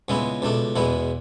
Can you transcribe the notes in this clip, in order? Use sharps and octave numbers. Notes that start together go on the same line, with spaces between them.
C#2 C#3 G#3 B3 E4
C#2 B2 A3 D4
E2 B2 G#3 B3 E4